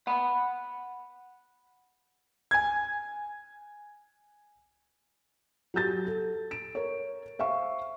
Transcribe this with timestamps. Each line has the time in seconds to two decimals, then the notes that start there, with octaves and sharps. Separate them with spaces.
0.07 F#5 B5
2.51 G#5 G#6
5.74 F#3 G4 G6 A6
6.07 A4
6.51 D7
6.75 A#4 C#5
7.39 C5 E5 F5 C#6